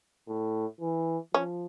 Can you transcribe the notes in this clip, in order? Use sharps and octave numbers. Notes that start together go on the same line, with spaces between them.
A2
E3
F3 C#4